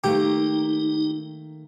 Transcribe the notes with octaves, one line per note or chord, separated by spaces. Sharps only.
D#3 A3 A#3 D#4 G4